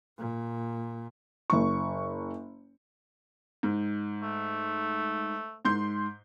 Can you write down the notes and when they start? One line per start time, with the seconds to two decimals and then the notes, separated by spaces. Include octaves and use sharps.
0.18 A#2
1.50 F#1 C#6
3.63 G#2
4.23 A3
5.65 G#2 C6 G6